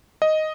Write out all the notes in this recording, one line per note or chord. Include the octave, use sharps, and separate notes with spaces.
D#5